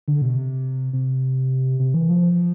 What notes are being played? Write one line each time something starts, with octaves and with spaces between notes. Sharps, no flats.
D3
B2
C3
C3
C3
E3
F3